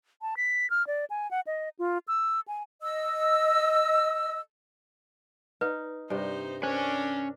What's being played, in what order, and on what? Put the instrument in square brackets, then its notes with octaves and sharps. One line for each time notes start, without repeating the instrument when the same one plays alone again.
[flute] A5
B6
F6
D5
G#5
F#5
D#5
F4
E6
G#5
[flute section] D#5 E6
[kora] D#4 [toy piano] B4
[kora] G2 C3 [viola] D#4 C5
[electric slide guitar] C#4 G#5 [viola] D4 A#4 [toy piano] C5